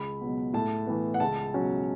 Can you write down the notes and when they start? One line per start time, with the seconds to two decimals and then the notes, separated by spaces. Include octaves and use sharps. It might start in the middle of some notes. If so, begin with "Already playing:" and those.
Already playing: C#2 B5
0.21 B2 F#3
0.53 A2 A5
0.87 E3 B3
1.14 F#5
1.20 C#2 A5
1.54 B2 F#3 C#4